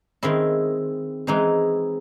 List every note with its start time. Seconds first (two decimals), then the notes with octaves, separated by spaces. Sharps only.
0.23 D#3 G#3 C4 E4
1.27 E3 G#3 C4 D#4